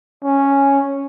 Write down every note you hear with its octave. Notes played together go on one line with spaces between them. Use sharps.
C#4